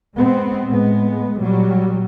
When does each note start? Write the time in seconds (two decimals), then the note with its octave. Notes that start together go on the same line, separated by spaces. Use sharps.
0.15 G#3 B3 C4
0.68 A2 G#3 B3
1.39 A#2 F#3 G3